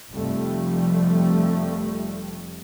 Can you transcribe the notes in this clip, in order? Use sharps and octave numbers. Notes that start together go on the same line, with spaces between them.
F1 F2 F3 G3 A3